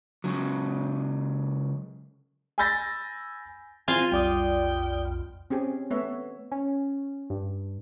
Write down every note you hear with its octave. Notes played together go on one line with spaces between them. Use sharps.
C#2 A2 C#3 F#3
G#5 B5 E6 G6 A6 A#6
D#3 C4 E4 F4 G#5
B1 F2 G3 D5 G5 D#6
C4 C#4 G4 G#4
A3 B3 C#5 E5
C#4
G2